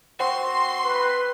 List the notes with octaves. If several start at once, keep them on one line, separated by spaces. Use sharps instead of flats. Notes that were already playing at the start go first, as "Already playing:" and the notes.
C4 F#4 C5 F#5 G5 C6
B4